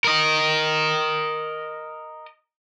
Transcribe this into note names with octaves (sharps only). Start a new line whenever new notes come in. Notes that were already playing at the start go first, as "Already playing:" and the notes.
A#4 D#5